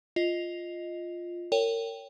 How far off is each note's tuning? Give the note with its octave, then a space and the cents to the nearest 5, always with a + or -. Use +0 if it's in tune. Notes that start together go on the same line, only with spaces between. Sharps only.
F4 +0 D#5 +0
A#4 -30 C#5 +10 G5 +0